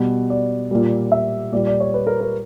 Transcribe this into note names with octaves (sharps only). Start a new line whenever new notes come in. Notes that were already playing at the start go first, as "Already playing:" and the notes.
Already playing: B2 G3
D5
A#2 G3
E5
A#2 G3 D5
D5
C#5
B4
A#4
A#4